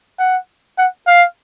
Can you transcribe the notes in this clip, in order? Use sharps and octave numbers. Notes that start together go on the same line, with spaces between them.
F#5
F#5
F5